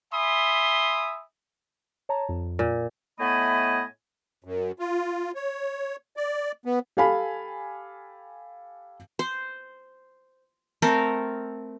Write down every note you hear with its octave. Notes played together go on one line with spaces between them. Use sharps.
E5 G#5 B5 C6 D#6
C#5 A5 A#5
F2
A#2
A2 A3 B3 D#5 G#5 B5
F#2
F4
C#5
D5
B3
G4 A4 F5 G#5 B5
C5
A3 C4 A4 A#4